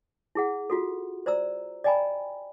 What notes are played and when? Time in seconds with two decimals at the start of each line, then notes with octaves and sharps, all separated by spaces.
0.35 E4 G#4 F#5
0.70 F4 F#4 A4
1.26 C5 D5 A#5 E6
1.84 D5 D#5 G5 G#5 A#5 B5